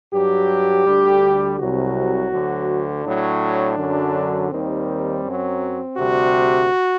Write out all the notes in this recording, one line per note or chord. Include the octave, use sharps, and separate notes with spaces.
G2 F#3 G4
D2 D3 G3
C2 C3 F#3 F#4
D2 D3 F#3
A2 F#3 D4
F#2 D3 F#3
D#2 D#3 G3 C4
F#2 F#3
D2 C3 G3 F#4